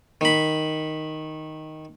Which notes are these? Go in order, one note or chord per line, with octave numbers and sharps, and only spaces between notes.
D#3 B5